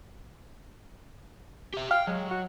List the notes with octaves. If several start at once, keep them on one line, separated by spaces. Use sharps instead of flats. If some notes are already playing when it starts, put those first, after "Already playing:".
G4 E5
F5 G5
F#3 G#3
F#4